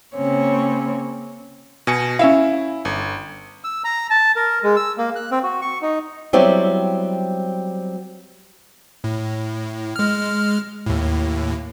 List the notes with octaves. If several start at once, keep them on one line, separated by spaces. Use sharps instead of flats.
C#3 A#3 C4 C#4 C#5
B2 G#5 C#7
C#4 E4 E5 F5
G1
E6
A#5
A5
A#4
G#3
E6
A#3
F#6
C4
F#4
C#6
D#4
F#3 G3 B3 C4 E4 G4
A2
G#3 F6
D#2 A2